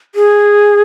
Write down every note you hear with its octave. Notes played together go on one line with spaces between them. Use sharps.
G#4